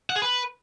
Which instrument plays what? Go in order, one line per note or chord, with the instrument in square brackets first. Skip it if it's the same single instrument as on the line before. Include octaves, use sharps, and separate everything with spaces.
[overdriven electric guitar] F#5
G#4
B4